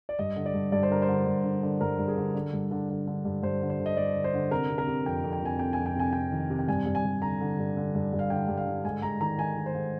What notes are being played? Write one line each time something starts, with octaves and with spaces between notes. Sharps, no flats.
D5
G2 D#5
D3
D5
G2
G2 D5
C5
D3 A#4
C5
D3
G2
D3
D3
G2 A#4
G2
G#4
D3
D3
G2
D3
D3
D3
G2
G2 C5
D3
C5
D3
D#5
G2 D5
D3
C5
D3
C3 A#4
C3
A#4
C3
F2 G5
F2
G5
F2 G#5
C3 G5
G#5
F2
G5
C3 G#5
C3 G5
D#3
C3
G5
G2 G#5
G2
G#5
G2
D3 A#5
D3
G2
D3
G2
G2
F5
D3 G5
G2
F5
D3
G#2 G#5
G#2 A#5
D#3 A#5
D#3 G#5
D#3
C5
G#2